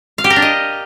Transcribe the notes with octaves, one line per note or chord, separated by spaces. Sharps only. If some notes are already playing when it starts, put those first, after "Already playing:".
F5
G4
A#4
D4
D#5